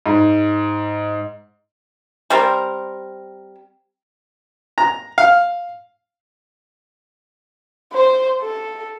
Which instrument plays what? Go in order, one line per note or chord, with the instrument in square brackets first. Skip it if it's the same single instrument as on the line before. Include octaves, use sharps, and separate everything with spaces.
[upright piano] G#2
[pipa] G3 C4 A#4
[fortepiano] A#5
F5
[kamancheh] C5
A4